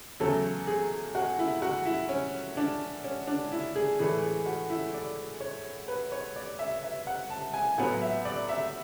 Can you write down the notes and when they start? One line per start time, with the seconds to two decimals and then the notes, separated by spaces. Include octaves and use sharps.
0.20 E2 C#3 F#3 A3 A4
0.67 G#4
1.15 F#4
1.39 E4
1.62 F#4
1.85 E4
2.09 C#4
2.57 D4
3.04 C#4
3.27 D4
3.52 E4
3.76 G#4
3.99 A2 E3 A3 G#4
4.23 G#4
4.46 F#4
4.70 E4
4.94 D5
5.41 C#5
5.88 B4
6.12 C#5
6.36 D5
6.59 E5
6.83 E5
7.07 F#5
7.30 A5
7.54 G#5
7.78 A2 F#3 B3 F#5
8.02 E5
8.25 D5
8.49 E5